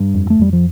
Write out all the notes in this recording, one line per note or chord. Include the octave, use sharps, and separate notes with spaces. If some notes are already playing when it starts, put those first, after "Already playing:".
Already playing: G2
F2
A3
F2 G3
F3